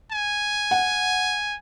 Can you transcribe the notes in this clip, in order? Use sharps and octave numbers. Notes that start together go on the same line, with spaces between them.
G#5
F#5